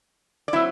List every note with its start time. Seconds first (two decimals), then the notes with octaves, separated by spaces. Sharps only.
0.48 D5
0.53 F#3 C4 E4 E5